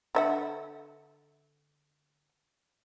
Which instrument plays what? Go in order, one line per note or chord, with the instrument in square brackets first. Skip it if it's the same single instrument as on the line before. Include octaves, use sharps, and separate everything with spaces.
[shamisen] D3 E5 F#5